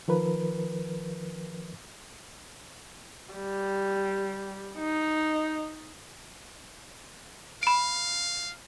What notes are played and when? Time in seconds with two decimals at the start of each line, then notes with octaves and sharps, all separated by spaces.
0.08 D#3 F3 A#4 B4
3.34 G3
4.78 D#4
7.63 F5 B5 D7